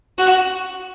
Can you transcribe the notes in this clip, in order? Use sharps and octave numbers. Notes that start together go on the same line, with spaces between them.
F#4